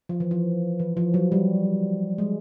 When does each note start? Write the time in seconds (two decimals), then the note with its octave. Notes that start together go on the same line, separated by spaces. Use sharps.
0.09 F3
0.20 E3
0.31 F3
0.80 E3
0.97 F3
1.14 F#3
1.32 G3
2.18 G#3